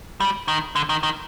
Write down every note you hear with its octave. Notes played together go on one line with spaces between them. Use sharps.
G3
D#3
D3
D#3
D#3